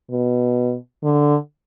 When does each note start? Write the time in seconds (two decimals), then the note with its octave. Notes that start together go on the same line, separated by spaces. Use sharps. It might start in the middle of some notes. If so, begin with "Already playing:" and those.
0.11 B2
1.04 D3